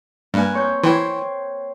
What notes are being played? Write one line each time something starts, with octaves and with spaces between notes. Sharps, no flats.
G2 A#3 B4 G#5
C4 C#5 G6
E3 C5 C#5 G5